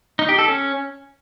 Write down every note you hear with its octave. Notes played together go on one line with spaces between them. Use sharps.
D#4
G4
A4
C#4